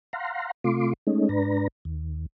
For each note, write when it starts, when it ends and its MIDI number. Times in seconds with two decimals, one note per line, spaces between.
0.13 0.51 77
0.13 0.51 78
0.13 0.51 82
0.13 0.51 84
0.64 0.93 48
0.64 0.93 57
0.64 0.93 65
0.64 0.93 84
0.64 0.93 86
1.07 1.29 56
1.07 1.29 57
1.07 1.29 61
1.07 1.29 63
1.29 1.68 44
1.29 1.68 62
1.29 1.68 71
1.29 1.68 82
1.85 2.26 39